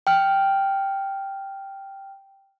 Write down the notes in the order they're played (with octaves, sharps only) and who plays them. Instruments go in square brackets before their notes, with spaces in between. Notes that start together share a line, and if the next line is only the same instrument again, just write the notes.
[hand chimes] G5 F6